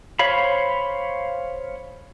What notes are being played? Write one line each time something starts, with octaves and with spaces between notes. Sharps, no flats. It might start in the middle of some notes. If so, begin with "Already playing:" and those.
C5 C#5 F5 B5